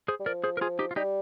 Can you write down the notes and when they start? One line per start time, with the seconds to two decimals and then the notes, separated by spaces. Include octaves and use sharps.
0.08 G#4 C5
0.20 G3
0.26 F3 A#4 D5
0.44 G#4 C5
0.57 A#4
0.61 F4 G#4
0.79 D#4 G4
0.91 F4
0.96 G3 D#4 G4